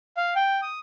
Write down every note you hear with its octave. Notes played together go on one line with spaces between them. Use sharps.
F5
G5
D#6